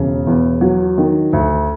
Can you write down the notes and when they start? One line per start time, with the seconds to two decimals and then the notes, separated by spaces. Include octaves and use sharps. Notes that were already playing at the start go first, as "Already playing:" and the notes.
Already playing: E1 C#3
0.27 E2
0.61 F#3
0.98 D#3
1.33 D2